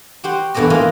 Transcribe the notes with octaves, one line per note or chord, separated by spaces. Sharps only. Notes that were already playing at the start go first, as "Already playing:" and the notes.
F#4 G4 C5
E2 G2 B2 A4 D5 D#5
E3 G#3 A#3 F4 G#4 D#5